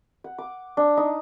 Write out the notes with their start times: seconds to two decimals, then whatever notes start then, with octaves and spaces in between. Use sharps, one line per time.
0.24 F#5
0.38 D6
0.77 D4
0.97 D#4